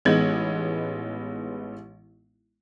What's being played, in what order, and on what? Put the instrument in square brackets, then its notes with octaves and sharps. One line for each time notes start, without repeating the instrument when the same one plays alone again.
[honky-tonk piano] A1 G#3 B3 D#4 G#6 F#7